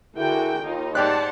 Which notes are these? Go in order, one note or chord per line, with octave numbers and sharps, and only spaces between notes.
D3 E4 F#4 G#4 A#4 G5
D#2 D#4 F4
G#2 G4 C5 D5 F#5 A5 F#6